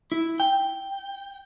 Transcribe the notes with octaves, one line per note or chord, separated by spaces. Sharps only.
E4
G5